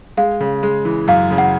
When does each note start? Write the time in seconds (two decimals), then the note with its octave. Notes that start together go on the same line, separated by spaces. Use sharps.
0.17 G#3 F5
0.41 C#3
0.63 G#3
0.85 E3
1.08 F#2 F5
1.31 C#3
1.38 F#5